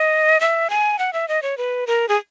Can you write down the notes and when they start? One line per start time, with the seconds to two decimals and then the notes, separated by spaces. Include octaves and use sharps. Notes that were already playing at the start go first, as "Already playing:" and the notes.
Already playing: D#5
0.41 E5
0.70 G#5
0.99 F#5
1.13 E5
1.28 D#5
1.42 C#5
1.58 B4
1.87 A#4
2.09 G#4